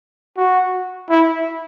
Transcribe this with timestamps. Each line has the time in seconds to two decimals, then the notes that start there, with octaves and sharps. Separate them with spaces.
0.37 F#4
1.10 E4